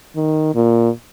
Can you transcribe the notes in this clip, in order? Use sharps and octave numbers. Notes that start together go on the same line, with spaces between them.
D#3
A#2